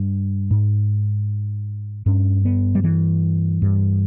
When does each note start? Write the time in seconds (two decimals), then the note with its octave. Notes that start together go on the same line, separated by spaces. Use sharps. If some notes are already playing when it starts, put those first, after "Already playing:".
Already playing: G2
0.51 G#2
2.06 G2 C#4
2.45 B3
2.75 G3
2.84 E3
3.62 G2